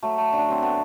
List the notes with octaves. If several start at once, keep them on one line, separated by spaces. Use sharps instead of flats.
F#3 A3
A3
D3
D4
F#3 C4
A3 B3